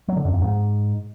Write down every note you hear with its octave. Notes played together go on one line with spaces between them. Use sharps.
F#3
D3
F#2
F2
G#2